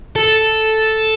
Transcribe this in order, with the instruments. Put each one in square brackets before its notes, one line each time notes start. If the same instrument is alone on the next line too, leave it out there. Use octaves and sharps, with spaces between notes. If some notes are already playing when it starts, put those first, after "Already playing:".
[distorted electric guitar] A4